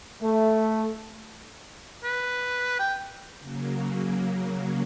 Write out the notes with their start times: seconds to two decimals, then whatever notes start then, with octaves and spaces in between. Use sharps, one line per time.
0.22 A3
2.04 B4
2.79 G5
3.40 C#3 F#3 A#3